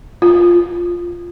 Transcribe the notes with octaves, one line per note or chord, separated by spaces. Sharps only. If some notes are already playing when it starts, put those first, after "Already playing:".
F4